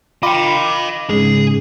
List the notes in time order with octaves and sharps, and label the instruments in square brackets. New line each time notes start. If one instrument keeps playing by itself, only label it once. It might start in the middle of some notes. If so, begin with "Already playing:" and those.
[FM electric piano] F4 B5 D6 [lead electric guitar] D#5 G5
[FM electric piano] G#2 C#3 [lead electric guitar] G#4